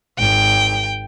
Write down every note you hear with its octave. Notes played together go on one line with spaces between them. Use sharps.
G#1 G5